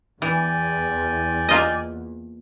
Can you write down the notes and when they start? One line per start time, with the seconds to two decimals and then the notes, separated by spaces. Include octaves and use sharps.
0.22 E2 E3 D5 G5 G#5
1.49 A#3 F4 D#5